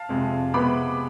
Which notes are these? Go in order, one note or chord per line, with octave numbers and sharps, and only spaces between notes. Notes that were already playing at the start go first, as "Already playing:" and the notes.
Already playing: F5 A5
F2 C3 G#3
C3 G#3 B3 B5 D6